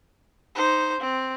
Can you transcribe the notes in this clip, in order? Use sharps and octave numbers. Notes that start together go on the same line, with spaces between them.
D#4 C5
C4